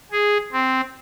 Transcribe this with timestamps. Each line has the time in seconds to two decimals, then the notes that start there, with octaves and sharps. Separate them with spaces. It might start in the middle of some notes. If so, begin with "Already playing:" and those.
0.12 G#4
0.53 C4